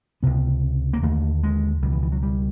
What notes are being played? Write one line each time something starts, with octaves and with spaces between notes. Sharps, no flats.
C#2 C3 B3
A#3
D#2 D3 A3
G#3
C#2 B2 G3
E3
E3
F#3
G3